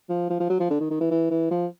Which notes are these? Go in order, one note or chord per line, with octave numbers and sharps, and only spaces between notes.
F3
F3
F3
F#3
F3
D3
D#3
D#3
E3
E3
E3
F3